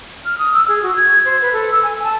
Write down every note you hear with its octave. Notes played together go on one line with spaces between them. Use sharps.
F6
D#6
E6
G#4
F#4
G#6
C5
B4
A4
E6
G#5
A5